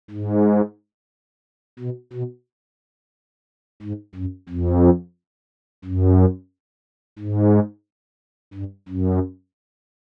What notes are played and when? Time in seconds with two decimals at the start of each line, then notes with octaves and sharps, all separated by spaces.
0.11 G#2
1.79 B2
2.13 B2
3.82 G#2
4.15 F#2
4.49 F2
5.85 F#2
7.19 G#2
8.54 G2
8.89 F#2